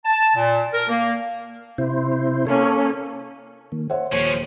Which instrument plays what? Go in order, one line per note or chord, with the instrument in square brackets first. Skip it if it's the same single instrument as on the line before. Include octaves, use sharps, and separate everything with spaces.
[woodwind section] A5
A#2
A#4
A#3
[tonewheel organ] C3 E4 C5
[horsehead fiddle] A#3 C#4 [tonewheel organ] A4 C#5
[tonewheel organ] D#3 A#3
[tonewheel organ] C5 [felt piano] C#5 E5 F#5
[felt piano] D#1 [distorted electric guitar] F3 C#4 [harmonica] C#5